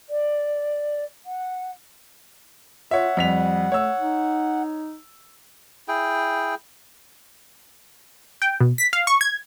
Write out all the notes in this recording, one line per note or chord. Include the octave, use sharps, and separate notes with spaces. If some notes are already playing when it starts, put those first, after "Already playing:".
D5
F#5
F4 C#5 E5 F#5
F2 G3 B6 F7
A3 C#5 E6
D#4
E4 G#4 G5
G5
B2
B6
F5
C#6
G#6